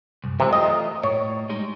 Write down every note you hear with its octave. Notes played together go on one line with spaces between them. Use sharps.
C2 F#2
C3 E3 F#3 G#3
A3 F4 A#4 D#5
A2 C#5
G3 G#3 D#4